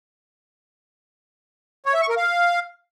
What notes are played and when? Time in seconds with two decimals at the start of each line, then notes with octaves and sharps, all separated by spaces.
1.86 C#5
1.94 E5
2.01 C#6
2.09 A#4
2.17 F5